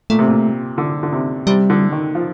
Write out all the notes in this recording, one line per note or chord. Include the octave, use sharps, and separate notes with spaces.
A#2 A3
C3
A#2
D3
D3
C3
C3 G3
D3
D#3
F3